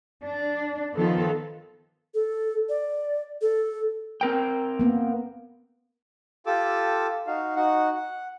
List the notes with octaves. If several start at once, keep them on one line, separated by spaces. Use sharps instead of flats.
D4
D#3 F3 B3 F4 A4
A4
D5
A4
C4 A#4 G5
A#3 B3
F4 G4 A4 D6 E6
D#4 F#4 F5
D#4 F#4 F#5
F#5